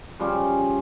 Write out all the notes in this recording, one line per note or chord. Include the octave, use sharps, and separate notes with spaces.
C#3 F3 G3 C#4